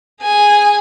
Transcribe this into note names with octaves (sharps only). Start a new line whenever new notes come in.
G#4 G#5